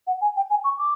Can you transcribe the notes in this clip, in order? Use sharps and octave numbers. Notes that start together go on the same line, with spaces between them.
F#5
G#5
G5
G#5
C#6
D6